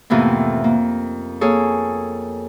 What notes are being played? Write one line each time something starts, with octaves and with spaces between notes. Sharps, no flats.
F2 A2 C3 E3 A#3 B3
A#3
A#3 G#4 A4 C#5